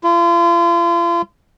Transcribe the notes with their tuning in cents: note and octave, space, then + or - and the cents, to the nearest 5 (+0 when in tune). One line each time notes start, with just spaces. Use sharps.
F4 -40